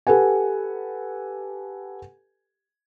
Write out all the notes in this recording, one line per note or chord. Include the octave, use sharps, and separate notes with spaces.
G4 A4 B4 F#5 G#5